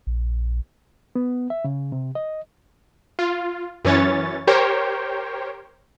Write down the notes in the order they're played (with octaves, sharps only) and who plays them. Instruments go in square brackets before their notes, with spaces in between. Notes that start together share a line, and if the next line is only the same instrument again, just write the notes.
[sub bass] A#1
[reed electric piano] B3
E5
C#3
C3
D#5
[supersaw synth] F4
F#2 E3 C#4 C#5 A6
G4 A#4 C5 C#5 G5